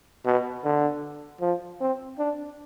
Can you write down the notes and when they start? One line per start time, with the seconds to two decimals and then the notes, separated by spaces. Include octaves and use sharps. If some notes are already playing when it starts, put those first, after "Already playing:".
0.25 B2
0.64 D3
1.41 F3
1.81 C4
2.19 D4